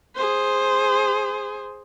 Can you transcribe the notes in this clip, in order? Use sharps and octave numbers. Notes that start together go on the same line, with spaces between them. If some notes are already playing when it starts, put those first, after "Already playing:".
G#4 C5